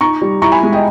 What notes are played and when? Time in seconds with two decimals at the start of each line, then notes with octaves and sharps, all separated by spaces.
0.01 D#4 A#5 C#6
0.21 G3
0.42 E4 A#5 C#6
0.52 G#5 B5
0.63 G#3
0.72 D#5 G5